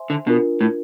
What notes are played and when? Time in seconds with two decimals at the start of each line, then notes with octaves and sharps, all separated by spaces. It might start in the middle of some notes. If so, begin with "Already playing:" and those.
Already playing: C5 E5 G#5 C6
0.10 D3
0.26 B2 D4 F4 A#4
0.61 A2